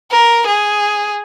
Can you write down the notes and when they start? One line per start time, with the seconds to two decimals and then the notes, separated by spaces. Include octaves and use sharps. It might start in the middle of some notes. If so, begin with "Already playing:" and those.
0.11 A#4
0.47 G#4